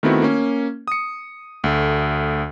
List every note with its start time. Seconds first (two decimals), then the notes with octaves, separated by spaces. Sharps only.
0.03 D#3 A3 B3 C4 E4 F#4
0.22 A#3 C#4
0.88 D#6 C#7
1.64 D2 A3